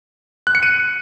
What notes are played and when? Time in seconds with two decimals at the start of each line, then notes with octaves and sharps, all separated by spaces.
0.47 F#6
0.55 C#7
0.63 D#7